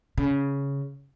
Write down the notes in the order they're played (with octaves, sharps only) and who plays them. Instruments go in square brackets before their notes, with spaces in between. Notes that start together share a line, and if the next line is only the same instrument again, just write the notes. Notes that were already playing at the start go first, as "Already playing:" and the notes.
[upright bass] C#3